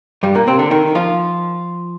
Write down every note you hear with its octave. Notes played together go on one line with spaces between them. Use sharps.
G2 G3
A#2 A#3
C3 C4
D3 D4
D#3 D#4
F3 F4